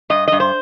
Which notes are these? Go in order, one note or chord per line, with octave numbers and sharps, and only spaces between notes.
G2 D#5
G2 D#5
C5